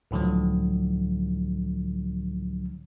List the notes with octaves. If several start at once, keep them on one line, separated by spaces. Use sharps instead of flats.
C#2 A2 D3 F3 F#3